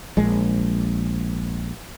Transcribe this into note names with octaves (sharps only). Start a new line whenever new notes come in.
A#1 G#3